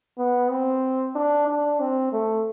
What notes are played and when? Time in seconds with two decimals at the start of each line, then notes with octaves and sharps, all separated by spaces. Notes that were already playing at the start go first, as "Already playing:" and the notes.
0.18 B3
0.50 C4
1.15 D4
1.47 D4
1.80 C4
2.12 A3